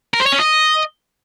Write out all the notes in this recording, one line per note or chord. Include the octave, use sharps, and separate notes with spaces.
A#4
C5
C#5
C#4
D#5